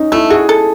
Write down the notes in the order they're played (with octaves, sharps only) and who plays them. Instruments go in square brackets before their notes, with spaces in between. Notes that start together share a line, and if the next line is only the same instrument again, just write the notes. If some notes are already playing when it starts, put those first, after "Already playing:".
Already playing: [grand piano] C#4 D#4
[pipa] A3 [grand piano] E4
[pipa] F#4 [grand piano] G#4
[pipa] A4